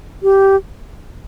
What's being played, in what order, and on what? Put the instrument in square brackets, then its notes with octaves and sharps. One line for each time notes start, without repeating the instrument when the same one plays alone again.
[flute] G4